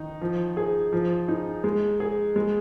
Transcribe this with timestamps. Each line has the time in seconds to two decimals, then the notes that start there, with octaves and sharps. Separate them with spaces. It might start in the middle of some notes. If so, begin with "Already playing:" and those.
Already playing: D#3 D#4
0.22 F3
0.57 G#4
0.93 F3
1.28 D#4
1.64 G#3
2.00 G#4
2.36 G#3